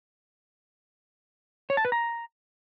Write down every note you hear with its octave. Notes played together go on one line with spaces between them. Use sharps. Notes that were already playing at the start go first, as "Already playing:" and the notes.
C#5
A5
B4
A#5